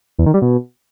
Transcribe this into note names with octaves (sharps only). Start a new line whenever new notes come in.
E2
D#3
G3
B2